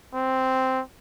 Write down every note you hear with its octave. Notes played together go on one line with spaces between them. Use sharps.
C4